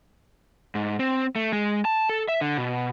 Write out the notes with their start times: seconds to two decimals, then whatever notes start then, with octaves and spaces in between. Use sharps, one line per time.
0.75 G#2
0.99 C4
1.36 A3
1.53 G#3
1.85 A5
2.09 A4
2.29 E5
2.41 D3
2.57 B2